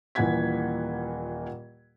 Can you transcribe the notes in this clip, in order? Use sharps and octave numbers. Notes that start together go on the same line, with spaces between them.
D#1 A#2 E3 F#5 G#6 B6